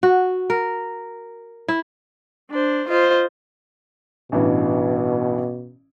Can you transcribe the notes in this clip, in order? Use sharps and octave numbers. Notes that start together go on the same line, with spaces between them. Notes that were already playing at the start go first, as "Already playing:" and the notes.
F#4
A#4
E4
D4 C5
F4 C5 D#5
A1 G2 B2 E3